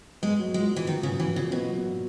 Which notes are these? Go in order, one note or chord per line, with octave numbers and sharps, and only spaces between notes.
G#3 B3
F#3
A#2 G#3
A#2
E3
D#3 B3
C#3 F#3
A#2 E3
A#2 C#3
B2 B3
F#3
A#2